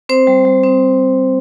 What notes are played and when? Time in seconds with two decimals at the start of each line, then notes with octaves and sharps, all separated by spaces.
0.09 C4 C5
0.27 G3
0.45 G3
0.64 C4